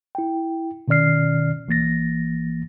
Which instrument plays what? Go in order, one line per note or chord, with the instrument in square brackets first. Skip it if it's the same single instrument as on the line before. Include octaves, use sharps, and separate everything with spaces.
[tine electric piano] E4 G5
B2 D#3 C#4 D5 F6 C7
A#1 E3 A#3 A6 A#6